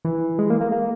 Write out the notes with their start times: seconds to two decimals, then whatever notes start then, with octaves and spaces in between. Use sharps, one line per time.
0.05 E3
0.39 G#3
0.50 A#3
0.61 A#3
0.72 A#3